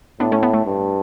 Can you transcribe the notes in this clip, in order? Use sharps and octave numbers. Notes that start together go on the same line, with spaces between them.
A2 B3 D4
A3 C#4
B3
A3
G2